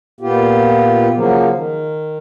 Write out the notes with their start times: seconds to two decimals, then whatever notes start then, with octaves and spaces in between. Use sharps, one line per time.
0.21 A#2 B3 F4 G4
1.14 C#3 F3 F#3 A#3
1.53 D#3